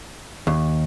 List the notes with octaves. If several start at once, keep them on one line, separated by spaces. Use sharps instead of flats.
D#2